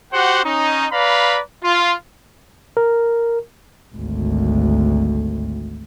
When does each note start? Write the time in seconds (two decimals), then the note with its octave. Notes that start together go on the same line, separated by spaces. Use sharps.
0.13 F#4 G4 C5 F#5
0.44 C#4 D#4
0.92 B4 D5 F5 A#5 B5
1.63 F4
2.77 A#4
3.96 G#1 D2